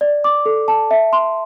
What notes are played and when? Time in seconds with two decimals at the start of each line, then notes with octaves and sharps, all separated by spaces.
0.01 D5
0.24 D6
0.46 A4
0.68 A5
0.91 E5
1.13 C6